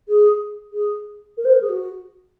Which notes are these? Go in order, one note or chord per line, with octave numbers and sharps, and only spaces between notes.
G#4
G#4
A#4
C5
A#4
G#4
F#4